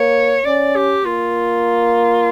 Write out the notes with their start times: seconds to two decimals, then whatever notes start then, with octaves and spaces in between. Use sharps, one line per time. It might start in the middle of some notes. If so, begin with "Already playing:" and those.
Already playing: A#3 C#5
0.45 C#4 D5
0.76 G4
1.05 A#3 F4